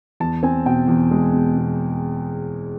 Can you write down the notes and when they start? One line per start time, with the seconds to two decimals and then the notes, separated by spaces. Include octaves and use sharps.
0.20 E2 A5
0.43 C4 G#5
0.66 B2 G5
0.88 E2
1.11 G#3
1.34 B2
1.57 B2